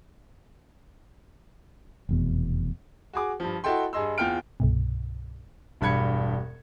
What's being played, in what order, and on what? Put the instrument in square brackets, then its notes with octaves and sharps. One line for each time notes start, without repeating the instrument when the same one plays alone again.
[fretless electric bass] F1 E2 B2
[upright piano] F#4 G#4 D6
G2 F3
E4 F#4 A4 D#5 G5 C6
G2 G#4 D#5 C6 E6
E2 F4 G5 F6 D7
[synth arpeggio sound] C2 G2 B2
[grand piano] E1 G2 B5 G#6 C#7